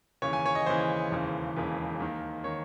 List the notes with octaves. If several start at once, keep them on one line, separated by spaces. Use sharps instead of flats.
D#2 C#3 E3 C#5
G#5
C#5
D#5
D#2 C#3 E3 C5
E1 D#2 C#3 E3
E1 D#2 C#3 E3
D#2 D#3
D#3 C#5